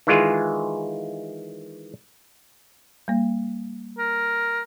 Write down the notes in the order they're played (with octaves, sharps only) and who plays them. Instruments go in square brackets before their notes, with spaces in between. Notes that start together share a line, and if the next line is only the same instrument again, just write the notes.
[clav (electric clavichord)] D#3 E3 G#3 F4 G#4
[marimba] G3 A#3
[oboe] A#4